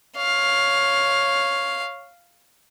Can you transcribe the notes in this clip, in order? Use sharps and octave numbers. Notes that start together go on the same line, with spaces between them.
C#5 F5